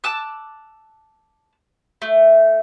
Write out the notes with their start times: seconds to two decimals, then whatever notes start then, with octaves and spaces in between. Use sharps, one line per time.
0.04 A5 D6 E6 F#6
2.02 A3